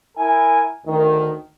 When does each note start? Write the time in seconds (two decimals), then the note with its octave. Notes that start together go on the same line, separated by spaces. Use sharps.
0.17 E4 A#4 G#5
0.86 D2 D#3